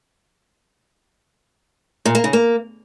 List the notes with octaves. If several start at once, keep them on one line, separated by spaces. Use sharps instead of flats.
A#2
A#3
C#3
A#3